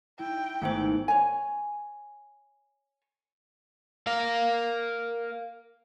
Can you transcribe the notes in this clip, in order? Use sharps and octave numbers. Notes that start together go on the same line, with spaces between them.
E4 G5
G#1 A3 B3 C5
C#5 G#5
A#4 F5